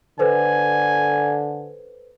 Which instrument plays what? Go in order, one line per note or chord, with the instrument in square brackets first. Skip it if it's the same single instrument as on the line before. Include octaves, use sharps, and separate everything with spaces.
[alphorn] D3 [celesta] A4 B4 C5 [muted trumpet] G#5